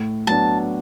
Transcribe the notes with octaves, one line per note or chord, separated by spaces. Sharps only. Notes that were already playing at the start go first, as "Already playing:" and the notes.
Already playing: A2
F#3 B3 D4 A5